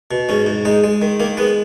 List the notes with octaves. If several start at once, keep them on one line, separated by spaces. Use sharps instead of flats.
B2
G#2 C#4
G#2
G#3 D#4
G#3
D#3
D#3 A#3
G#3 B3